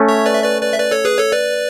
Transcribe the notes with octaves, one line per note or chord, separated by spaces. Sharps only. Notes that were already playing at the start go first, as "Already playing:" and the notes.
Already playing: A3 C#4
C#5 E5
B4 D5
E5
B4 D5
B4 D5
E5
B4 D5
A4 C#5
G#4 B4
A4 C#5
B4 D5